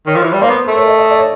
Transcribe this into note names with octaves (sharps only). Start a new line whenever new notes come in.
D#3 C#5
F3
E3
G3
A#3 C5
B3
B4
A#4
A3
C#5
D#5
D#5
D5
C#5